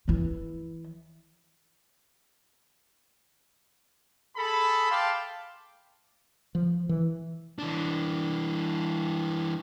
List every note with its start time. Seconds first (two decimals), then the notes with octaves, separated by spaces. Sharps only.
0.08 E3 E4
4.36 G#4 A4 B5
4.90 F5 G5 A5 C6 D6
6.55 F3
6.89 E3
7.59 E3 D4